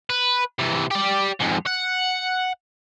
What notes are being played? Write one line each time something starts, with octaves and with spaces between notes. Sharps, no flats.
B4
C3 E3
G4 D5
F2 G#2
F#5